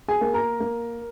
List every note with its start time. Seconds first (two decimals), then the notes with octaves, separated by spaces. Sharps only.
0.08 G#4 G#5
0.21 A#3
0.34 A#4 A#5
0.60 A#3